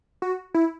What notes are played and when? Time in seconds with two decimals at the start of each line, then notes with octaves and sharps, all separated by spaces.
0.22 F#4
0.54 E4